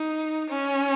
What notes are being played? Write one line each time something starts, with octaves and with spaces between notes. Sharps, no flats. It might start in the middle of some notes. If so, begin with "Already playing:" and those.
Already playing: D#4
C#4